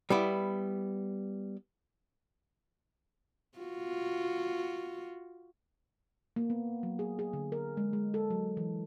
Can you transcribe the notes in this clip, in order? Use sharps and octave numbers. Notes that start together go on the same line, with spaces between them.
G3 B3 E4
F4 F#4
A#3
B3
F#3
G#4
G#4
D3
A#4
G#3
G#3
A4
F#3
E3